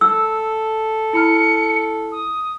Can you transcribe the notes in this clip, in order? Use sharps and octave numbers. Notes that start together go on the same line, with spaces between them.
A4 E6
E4 B5 F6 C#7
D#6